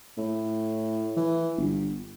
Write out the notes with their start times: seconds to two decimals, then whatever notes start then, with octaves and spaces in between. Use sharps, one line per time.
0.18 A2
1.16 E3
1.57 G1